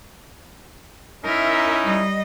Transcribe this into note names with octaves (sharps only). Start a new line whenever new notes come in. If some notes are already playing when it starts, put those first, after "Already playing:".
C#4 D#4 E4 A#4 E5
G3 D#5